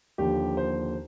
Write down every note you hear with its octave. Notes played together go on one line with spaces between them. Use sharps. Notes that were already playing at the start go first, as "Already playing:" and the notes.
D#2 D3 F3 G4
C5